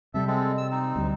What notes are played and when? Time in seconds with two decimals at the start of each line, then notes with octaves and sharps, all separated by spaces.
0.14 C3 G3 A4 E5
0.27 G#3 C4 A4
0.58 E6
0.71 C4 D#4
0.96 D2 G3